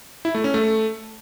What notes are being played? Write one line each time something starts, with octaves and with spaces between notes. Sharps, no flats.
E4
A3
C#4
A3